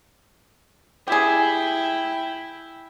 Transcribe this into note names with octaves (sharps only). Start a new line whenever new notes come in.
E4 G4 G#4 G5